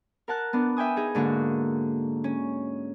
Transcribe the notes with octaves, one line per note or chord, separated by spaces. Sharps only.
A#4 F#5 A5 F#6
B3 D4
E5 G5 G#5 D#6
D#4 G#4
G#2 D3 A#3 F#4
C#4